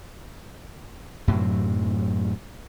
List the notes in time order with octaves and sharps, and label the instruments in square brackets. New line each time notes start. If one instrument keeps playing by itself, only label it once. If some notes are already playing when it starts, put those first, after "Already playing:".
[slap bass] F#2 A2 C3 F#3